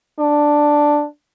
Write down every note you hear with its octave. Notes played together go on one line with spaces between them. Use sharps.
D4